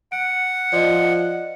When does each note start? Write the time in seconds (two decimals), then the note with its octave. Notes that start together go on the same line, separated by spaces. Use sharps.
0.12 F#5 D7
0.73 F3 D5 D#5